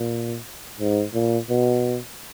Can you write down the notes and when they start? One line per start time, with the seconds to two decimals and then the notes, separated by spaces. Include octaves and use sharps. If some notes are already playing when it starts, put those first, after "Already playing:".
Already playing: A#2
0.79 G#2
1.14 A#2
1.49 B2